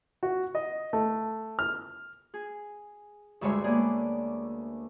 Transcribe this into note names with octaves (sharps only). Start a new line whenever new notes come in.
F#4
D#5
A3
F6
G#4
D2 G2 G3 G#3 C#5 E5
A#3 B3 G#4 D5